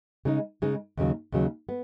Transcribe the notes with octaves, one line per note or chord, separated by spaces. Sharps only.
C#3 G#3 D#4
C#3 G#3 D#4
D#2 C#3 F#3
D#2 C#3 F#3
B3